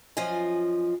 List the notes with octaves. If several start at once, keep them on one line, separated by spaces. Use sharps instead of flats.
F#2 F3 F4 D#5 G#5